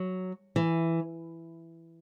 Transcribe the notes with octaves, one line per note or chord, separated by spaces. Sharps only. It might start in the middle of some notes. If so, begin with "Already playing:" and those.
Already playing: F#3
E3